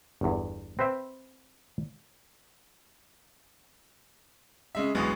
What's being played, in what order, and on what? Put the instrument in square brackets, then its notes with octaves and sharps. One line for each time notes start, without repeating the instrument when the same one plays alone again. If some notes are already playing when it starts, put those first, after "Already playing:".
[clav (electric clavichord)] G1 E2
C4 B4 C5 E5 G5
[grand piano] C#3 G#3 E5
[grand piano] A1 D2 [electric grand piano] F#3 G#3 B3